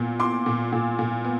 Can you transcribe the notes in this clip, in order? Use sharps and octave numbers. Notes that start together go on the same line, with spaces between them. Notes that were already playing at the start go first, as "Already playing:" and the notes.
Already playing: A#2 B3
B3 C6 D6
A#2
A#2
A#2
B3